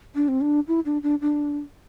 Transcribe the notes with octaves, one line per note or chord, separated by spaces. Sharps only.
D4
C4
D4
E4
D4
D4
D4